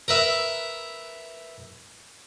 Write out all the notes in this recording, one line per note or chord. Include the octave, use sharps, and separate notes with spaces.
A#4 B4 E5